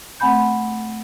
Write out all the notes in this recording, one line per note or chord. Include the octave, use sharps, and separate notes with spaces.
A3 C4 F#5 G#5 B5 G6